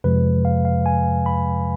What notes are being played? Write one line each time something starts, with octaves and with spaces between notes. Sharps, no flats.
F2 C3 F3 G#3 B4
F5
F5
G#5
B5